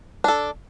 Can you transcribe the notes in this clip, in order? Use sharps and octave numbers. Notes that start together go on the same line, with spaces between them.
D4 A4